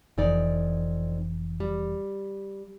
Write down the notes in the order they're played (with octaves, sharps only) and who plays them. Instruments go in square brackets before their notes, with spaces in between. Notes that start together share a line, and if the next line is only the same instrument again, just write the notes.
[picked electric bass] F1 E3 [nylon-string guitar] F2 D#4 D5
[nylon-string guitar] G3